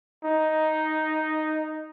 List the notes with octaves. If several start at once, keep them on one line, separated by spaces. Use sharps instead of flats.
D#4